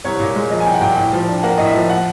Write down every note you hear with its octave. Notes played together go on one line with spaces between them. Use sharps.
C2 C#5
A#2
G#3
F3 D#5
G#5
C2 G5
F#5
A#2 G5
A2 G5
F3
D4
A#3 F#5
A2 D#5
E5
F3
F#5